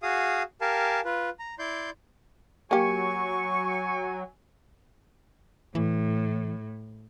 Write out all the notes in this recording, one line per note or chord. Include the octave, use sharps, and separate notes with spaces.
F#4 G#4 F5 D#6
G4 A#4 F5 G#5 A5
F4 B4
A#5
E4 D5 C6 G6
F#3 A#3 G4 G#5 C#6
A2 E3